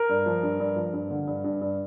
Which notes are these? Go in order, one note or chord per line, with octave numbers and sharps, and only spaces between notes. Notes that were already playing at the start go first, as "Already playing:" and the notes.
Already playing: A#4
G2
F3
G2
G2
F3
G2
D3
G2
G2
G2